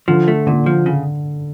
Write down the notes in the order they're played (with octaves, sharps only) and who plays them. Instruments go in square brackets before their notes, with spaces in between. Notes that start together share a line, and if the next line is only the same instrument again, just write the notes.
[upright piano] D3 [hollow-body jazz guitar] F3
[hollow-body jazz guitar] A3
[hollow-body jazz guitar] A#2 [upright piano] D3
[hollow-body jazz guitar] F3
C#3